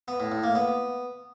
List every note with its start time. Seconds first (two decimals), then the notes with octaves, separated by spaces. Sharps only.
0.08 B3
0.20 A2
0.32 A2
0.43 A#3
0.55 B3